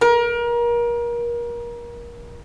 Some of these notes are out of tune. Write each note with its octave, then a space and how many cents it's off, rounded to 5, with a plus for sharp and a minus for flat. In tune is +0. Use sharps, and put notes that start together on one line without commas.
A#4 +30